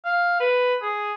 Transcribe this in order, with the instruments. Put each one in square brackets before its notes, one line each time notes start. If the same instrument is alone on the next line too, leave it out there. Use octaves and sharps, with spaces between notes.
[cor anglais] F5
B4
G#4